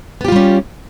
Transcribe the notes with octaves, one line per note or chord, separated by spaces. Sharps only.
G3 B3 C#4 F4 G4